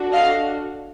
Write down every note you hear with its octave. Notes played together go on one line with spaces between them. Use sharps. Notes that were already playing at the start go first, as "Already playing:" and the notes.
Already playing: D4 F#4 A4
D#5 F5